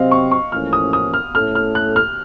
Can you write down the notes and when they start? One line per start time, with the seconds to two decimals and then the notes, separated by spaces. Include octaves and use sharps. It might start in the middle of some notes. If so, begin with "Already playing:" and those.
Already playing: C3 F#3 C4 D#5 F5
0.11 C#6
0.31 C#6
0.52 A1 A2 F3 A#3 C#4 F6
0.73 D#6
0.93 D#6
1.14 F6
1.34 A2 A3 C#4 A4 F6
1.55 F6
1.75 F#6
1.96 F6